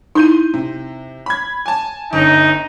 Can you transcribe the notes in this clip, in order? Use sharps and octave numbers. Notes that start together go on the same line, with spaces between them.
D#4 E4 C6 G6 D#7
C3
B5 G#6
G#5 A5
G1 C#4 D#4